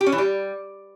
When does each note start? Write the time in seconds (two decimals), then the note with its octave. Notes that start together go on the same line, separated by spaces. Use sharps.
0.01 G4
0.06 C#4
0.12 E3
0.18 G3